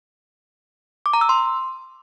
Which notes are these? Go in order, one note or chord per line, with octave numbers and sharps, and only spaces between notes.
D6
A#5
E6
C6